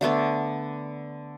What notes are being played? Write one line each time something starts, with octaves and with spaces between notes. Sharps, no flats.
D3 A3 B3 D4